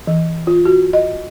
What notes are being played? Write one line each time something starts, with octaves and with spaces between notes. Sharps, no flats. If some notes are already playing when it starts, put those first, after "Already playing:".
E3
F4
F#4
D#5